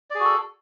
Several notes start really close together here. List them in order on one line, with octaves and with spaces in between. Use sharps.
D5 G#4 F#4 A4